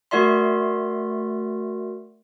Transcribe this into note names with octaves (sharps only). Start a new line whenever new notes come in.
A3 F#4 A#4 D5 E5 C6